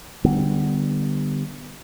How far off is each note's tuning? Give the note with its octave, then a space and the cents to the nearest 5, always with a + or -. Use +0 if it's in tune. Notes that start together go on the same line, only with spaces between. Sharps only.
D3 +20 G3 +0 B3 +0